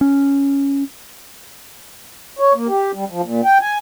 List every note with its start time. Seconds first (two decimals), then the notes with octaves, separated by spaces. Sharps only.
0.01 C#4
2.39 C#5
2.54 A#3
2.68 G4
2.94 G3
3.10 F3
3.23 A#2
3.44 G5
3.61 G#5